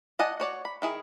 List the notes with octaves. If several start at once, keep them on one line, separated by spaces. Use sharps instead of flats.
D5 D#5 F#5 G#5 A5
F#4 C#5 D5
B5
D#3 E4 G#4